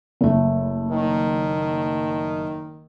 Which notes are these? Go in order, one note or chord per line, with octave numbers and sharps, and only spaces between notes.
F#1 A3
D#3